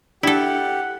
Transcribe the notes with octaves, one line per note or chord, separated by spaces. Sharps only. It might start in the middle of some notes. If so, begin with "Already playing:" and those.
D4 E4 G4 A4 F#5